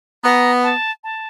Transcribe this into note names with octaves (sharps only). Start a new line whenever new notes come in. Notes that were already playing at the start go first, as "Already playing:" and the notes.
B3 A#5
A5
A5